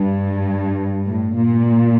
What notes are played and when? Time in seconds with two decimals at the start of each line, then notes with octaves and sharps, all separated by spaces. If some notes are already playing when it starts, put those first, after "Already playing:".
Already playing: G2
1.06 A2
1.36 A#2